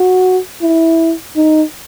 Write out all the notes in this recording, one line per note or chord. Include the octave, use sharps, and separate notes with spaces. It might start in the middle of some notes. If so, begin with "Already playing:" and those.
Already playing: F#4
E4
D#4